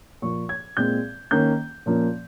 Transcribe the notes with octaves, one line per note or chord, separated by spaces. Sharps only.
A#2 F3 A#3 C#6
G#6
A#2 G#3 C4 G6
D#3 A#3 C#4 G6
A#2 F3 A#3 C#4